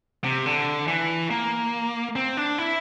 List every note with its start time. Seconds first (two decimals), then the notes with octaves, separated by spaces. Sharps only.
0.24 C3
0.46 D3
0.88 E3
1.30 A#3
2.16 C4
2.37 D4
2.58 E4